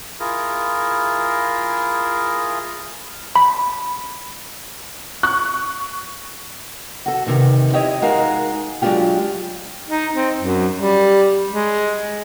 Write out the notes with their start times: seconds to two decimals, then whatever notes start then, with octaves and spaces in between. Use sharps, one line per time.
0.20 E4 F4 G#4 A#4
3.36 B5
5.23 C#6 F#6
7.06 F#4 A4
7.26 E2 C3 D#3 D#4
7.73 E4 G4 C#5 D#5
8.02 G#3 D#4 F#4 A#4 F5
8.82 F#3 G#3 A3 D4 F4 G4
9.89 D#4
10.15 C4
10.39 F#2
10.78 G3
11.51 G#3